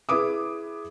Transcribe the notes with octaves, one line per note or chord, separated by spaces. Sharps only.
E4 G#4 B4 D6 D#6